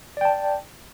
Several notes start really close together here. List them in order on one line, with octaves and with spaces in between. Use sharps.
D5 G5 A5